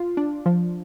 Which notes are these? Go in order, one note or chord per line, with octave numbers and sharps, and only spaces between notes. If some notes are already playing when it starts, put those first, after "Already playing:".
Already playing: F4
D4
F3